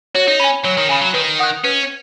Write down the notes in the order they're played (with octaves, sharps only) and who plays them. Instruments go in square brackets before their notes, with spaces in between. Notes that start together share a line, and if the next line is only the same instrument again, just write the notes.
[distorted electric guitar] F#4 [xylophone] C#5
[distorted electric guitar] D#4
[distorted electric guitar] C#4 [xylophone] G#5 B5
[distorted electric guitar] F#3 [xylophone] C#5
[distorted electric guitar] D#3
[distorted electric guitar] C#3 [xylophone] G#5 B5
[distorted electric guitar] F#3
[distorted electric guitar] D#3 [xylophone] B4
[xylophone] F#5 D#6 F#6
[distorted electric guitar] C#4 [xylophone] B4